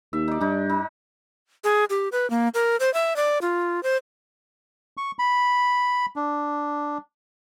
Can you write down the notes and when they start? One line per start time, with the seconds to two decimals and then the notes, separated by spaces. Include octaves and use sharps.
0.13 D#2 E5
0.28 D#4 D5
0.41 G2 D4 D#4
0.70 D#4
1.64 G#4
1.90 G4
2.12 B4
2.30 A#3
2.54 A#4
2.80 C5
2.94 E5
3.16 D5
3.41 F4
3.83 C5
4.97 C#6
5.19 B5
6.16 D4